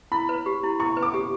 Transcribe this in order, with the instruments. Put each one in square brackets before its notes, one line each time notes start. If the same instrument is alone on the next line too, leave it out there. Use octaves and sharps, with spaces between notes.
[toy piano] E4 [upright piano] B5
[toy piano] B4
G4
E4
[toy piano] E4 [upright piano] C#6
[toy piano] B4
[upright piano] D6
[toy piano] G4